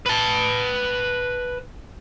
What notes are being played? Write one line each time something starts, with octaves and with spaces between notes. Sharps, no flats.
B4 A5